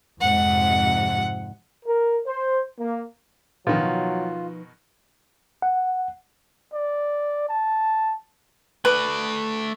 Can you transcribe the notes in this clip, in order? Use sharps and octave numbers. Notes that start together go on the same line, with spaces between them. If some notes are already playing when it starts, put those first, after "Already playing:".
F2 G#2 C3 F#5
A#4
C5
A#3
B2 D#3 F3 F#3 D#4 F4 B4
F#5
D5
A5
A3 B4 D5